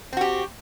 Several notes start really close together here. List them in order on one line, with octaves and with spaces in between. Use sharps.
C4 F#4 G4